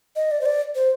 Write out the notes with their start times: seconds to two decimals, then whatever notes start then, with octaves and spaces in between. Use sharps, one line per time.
0.16 D#5
0.31 D5
0.41 C5
0.46 D5
0.75 C5